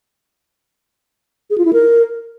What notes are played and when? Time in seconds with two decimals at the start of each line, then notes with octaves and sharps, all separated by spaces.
1.50 G#4
1.58 F4
1.65 E4
1.73 A#4